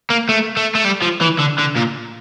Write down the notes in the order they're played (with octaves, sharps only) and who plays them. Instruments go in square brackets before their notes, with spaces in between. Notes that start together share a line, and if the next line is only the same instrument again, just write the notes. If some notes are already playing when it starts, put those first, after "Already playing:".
[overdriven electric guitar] A#3
A3
A3
A3
G3
F3
E3
D3
D3
A#2